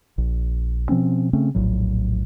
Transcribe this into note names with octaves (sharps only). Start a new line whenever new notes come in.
A#1
B2 F3 C4 C#4
C#3 A3 C4 C#4
E1 A#1 A2 F#3